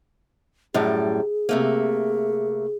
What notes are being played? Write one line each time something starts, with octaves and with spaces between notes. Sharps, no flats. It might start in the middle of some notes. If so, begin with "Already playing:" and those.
F#2 A2 G3 G#4
C3 A3 A#3